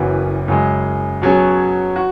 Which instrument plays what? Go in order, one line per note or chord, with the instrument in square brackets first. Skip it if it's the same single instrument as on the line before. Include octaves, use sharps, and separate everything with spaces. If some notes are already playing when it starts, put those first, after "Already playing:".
Already playing: [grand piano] F#1 F#2 E3 B3 F#4
F#2 C#3 G#3
B2 F#3 C#4 G#4
F#4